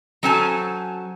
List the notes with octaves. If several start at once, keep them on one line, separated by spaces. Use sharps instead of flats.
F#3 C#4 A4 C5 G#5 A5